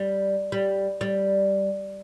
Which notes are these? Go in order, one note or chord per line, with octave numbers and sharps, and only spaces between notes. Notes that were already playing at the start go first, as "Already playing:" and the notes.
Already playing: G3
G3
G3